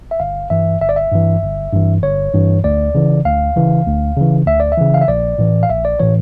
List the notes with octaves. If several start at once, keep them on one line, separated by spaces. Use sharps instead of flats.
E5
G1 F5
G2 E3 E5
G1 E5
D5
E5
G2 E3
G1
G2 E3
G1 C#5
G2 E3
D2 D5
C#3 E3
D2 F5
C#3 E3
D2
C#3 E3
D2 E5
D5
E5
C#3 E3
F5
E5
A#1 D5
A2 E3
F5
A#1 E5
D5
A2 E3 C#5